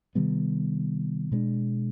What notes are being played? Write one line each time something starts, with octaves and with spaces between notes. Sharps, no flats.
C3 D#3 G3 B3
B2 G#3 B3 D4